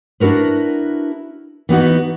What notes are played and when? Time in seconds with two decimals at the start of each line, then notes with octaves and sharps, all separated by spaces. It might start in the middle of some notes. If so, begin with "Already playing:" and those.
0.20 D4 E4 F#4 A#4 B4
1.69 E3 B3 D#4 F#4